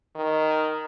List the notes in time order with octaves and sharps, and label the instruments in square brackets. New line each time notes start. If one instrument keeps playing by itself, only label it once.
[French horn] D#3